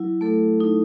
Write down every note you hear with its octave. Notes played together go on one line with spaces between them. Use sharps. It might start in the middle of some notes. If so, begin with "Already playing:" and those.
Already playing: F#3 E4
A3 A4
D#4